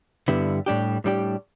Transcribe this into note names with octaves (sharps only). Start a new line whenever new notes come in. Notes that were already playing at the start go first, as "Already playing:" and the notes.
G2 D3 G3 B3 E4
A2 G3 D4 G4
A2 G3 D4 G4